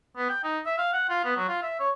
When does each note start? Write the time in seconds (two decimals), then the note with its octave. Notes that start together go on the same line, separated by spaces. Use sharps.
0.17 B3
0.29 G5
0.43 D#4
0.66 E5
0.78 F5
0.93 F#5
1.09 F4
1.25 B3
1.36 F#3
1.48 F4
1.63 E5
1.80 C#5